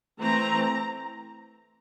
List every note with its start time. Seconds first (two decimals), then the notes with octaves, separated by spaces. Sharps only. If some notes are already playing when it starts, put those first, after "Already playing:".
0.20 E3 A3 C4 A#5